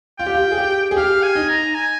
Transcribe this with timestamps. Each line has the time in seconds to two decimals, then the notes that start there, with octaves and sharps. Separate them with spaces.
0.19 F4 G5
0.27 G4
0.34 F4
0.52 G#4
0.58 G4
0.91 G#4
0.96 G4 F5
1.23 G#5
1.35 D#4
1.49 A#5
1.75 G#5